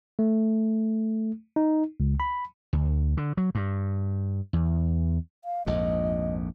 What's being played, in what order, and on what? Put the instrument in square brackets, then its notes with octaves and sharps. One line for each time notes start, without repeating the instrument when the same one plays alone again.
[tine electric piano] A3
D#4
C#2
B5
[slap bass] D2
D3
F#3
G2
E2
[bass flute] F5
[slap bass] A#1 F2 G#2 [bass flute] D#5